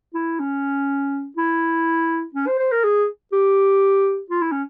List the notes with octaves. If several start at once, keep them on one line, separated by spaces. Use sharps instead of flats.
E4
C#4
E4
C#4
C5
C5
A#4
G#4
G4
F4
E4
C#4